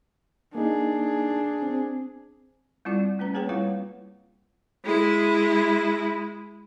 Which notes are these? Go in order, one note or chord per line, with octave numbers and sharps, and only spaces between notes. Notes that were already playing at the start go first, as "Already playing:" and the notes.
A#3 D4 D#4 G#4
C4
G3 C4 E4 F4 D5
A3 C#4 B4 A#5
A#3 C4 G#4 B4 C#5 G5
G3 E4 F4 C#5 F5 F#5
G#3 E4